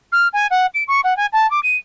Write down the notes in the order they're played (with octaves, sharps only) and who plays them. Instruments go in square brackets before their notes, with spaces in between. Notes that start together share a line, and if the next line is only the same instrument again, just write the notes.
[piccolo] F6
G#5
F#5
D7
C#6
F#5
G#5
A5
D6
D#7